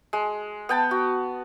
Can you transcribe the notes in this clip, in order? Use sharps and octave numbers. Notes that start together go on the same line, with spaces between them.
G#3
B3 G5 A5
F#4